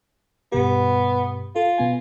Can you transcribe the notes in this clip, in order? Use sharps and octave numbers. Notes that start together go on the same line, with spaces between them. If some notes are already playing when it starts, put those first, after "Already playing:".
G2 B2 B3 G4
F4 A4
B2 B3 G#5